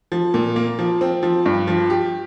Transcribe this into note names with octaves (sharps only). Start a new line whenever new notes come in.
F3
A#2
A#3
F3
C4
F3
G2
F3
G4